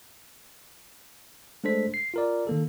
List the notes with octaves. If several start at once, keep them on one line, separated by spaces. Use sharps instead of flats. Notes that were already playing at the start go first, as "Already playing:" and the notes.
G#3 A3 D4 A4 C5 B6
C7
F4 A#4 D5
D#3 A#3 A4